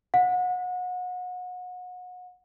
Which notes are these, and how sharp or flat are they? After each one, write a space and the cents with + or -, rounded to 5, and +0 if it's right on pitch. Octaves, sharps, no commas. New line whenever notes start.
F#5 -30